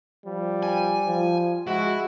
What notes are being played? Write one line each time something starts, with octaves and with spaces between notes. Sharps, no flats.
F3 G3
G#5
F3
G#3 E4 F#4